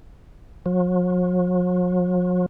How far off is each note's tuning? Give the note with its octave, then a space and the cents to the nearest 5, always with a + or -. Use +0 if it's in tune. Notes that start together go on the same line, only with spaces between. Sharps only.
F#3 -45